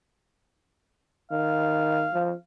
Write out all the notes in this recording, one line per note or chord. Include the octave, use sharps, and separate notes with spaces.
D#3 F5
F3